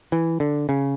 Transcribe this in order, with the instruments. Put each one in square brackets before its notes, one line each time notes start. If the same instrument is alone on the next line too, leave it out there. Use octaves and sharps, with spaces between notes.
[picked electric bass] E3
D3
C#3